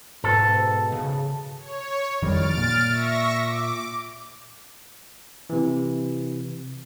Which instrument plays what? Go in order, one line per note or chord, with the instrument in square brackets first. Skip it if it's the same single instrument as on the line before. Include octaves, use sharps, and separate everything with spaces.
[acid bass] G#2 [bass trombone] B2 [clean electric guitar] A4
[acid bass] C#3
[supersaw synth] C#5
[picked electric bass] F2 D#3 G3 [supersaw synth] F6 A6 D7
[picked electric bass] A#2
[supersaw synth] E5 C#6 A#6
D6
[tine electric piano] C3 E3